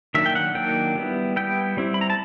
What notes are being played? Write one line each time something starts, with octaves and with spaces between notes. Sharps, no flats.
D#3 F#3 A#3 D4 E5
G5
F#5
D#3 F#3 A#3 D4 G5
G3 B3 E4
G3 B3 E4 G5
G3 C4 E4
B5
A#5
A5